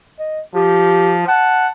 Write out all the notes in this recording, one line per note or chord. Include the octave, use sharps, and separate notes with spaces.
D#5
F3 G4
F#5 A5